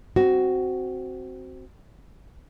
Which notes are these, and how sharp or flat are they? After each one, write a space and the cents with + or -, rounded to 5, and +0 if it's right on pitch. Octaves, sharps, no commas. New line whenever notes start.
C4 +0 F#4 +10